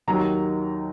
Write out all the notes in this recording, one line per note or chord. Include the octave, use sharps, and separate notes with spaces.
D#2 D#3 F#3 A#5